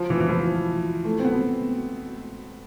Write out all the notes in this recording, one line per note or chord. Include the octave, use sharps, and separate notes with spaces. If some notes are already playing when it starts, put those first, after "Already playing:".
Already playing: F3
E3
E3
F3
A3
C4
B3